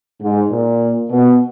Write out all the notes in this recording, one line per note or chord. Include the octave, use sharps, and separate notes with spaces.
G#2
A#2
B2